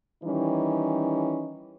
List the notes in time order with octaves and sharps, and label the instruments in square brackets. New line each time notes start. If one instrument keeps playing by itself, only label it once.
[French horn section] D#3 E3 G3 C#4 D#4